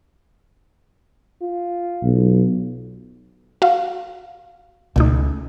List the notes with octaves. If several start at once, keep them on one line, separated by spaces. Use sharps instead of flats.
F4
B1
F#4 F5
C#2 B2 A3 D#4